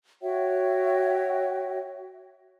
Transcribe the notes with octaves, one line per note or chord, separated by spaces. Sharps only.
F#4 C#5 E5 G5